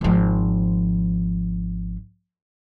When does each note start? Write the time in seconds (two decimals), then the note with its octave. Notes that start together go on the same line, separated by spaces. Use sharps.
0.01 G#1 F3